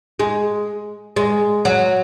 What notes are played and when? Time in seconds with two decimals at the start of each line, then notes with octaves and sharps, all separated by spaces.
0.19 G#3
1.16 G#3
1.65 F#3